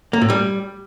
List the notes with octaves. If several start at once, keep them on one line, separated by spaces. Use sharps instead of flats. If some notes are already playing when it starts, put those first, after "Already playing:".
A#3
A2
G3